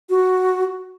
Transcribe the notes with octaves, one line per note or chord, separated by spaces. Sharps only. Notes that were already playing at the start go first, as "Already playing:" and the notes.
F#4